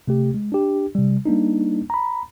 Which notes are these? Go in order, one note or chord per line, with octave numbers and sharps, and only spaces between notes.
C3 A3 G4
G#3
D4 G4
C3 G3
G3 A#3 D4 D#4
A#5 B5